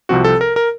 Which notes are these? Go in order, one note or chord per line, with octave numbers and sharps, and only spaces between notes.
C2 C3 F3 C4 F#4
A4
A#4
A#4